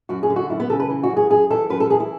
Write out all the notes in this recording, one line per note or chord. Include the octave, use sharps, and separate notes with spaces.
F#2 F#4
G#4
D3
F#4
F#2 E4
B3
C#3 A4
B4
E3
F#4
F#2
G#4
F#2 G#4
E3 A4
F#2 B4
A4
E3 G#4
E4